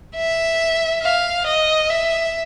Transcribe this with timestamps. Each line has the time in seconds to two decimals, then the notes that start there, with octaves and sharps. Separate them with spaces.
0.16 E5
1.02 F5
1.47 D#5
1.90 E5